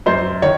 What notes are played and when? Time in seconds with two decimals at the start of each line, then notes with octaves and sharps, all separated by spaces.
0.06 F#2 C5
0.42 D#3 C#5